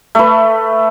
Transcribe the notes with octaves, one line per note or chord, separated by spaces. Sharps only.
A3 B4